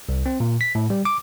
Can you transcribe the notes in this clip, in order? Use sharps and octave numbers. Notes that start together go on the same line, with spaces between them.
C2
C4
A#2
B6
A2
G3
D6